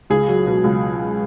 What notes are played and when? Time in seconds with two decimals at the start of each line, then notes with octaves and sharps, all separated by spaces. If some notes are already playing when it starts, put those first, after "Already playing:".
0.10 C#2 G#4
0.28 F#3
0.46 B2
0.64 C#2